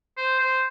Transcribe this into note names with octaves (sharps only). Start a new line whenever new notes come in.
C5
C5